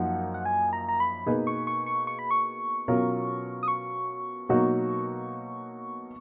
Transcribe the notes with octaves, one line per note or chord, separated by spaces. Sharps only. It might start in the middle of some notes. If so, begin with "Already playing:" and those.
Already playing: F#2 F3 A#3 D#4 A#4 F#5
F#5
G#5
A#5
A#5
B5
B2 A#3 D#4 G#4 B4
C#6
C#6
C#6
C#6
B5
C#6
B2 F#3 C#4 F4 A#4
D#6
C#6
B2 F#3 A#3 D#4 F#4